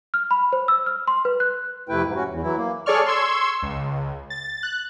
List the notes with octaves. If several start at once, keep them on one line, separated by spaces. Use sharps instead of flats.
F6
B5
C5
E6
F6
C6
B4
F#6
F2 C3 A3 E4 B4 G5
G#2
C#4 F#4
E2
E3 F#3 E4
A#3
G#4 A4 C#5 D5 C#6 F6
C6 C#6 E6 G#6
C#2
A6
F#6